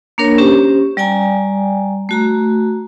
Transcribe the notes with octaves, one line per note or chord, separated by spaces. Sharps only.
A#3 D4 A#4 C#5
C#4 G4 C5
G3 D5 G5 G#5 A#5
A3 F#4 A#5